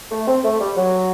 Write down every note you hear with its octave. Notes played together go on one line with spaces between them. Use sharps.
A3
C4
A3
G3
F#3